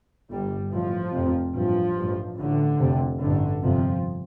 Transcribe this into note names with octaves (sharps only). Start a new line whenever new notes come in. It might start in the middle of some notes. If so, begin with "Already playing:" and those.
G1 G2 G3
A1 A2 F3
F1 F2 C3
A1 G2 F3
A1 G2
A1 A2 D3
F1 F2 C3
A1 G2 D3
G1 F2 C3 F3